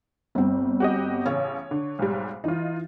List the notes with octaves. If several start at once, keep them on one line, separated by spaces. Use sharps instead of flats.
G1 C4
F#4 G4 D#5
A1 C#3 C#5
D3
B1 G#2 G3
E3 D#4 F4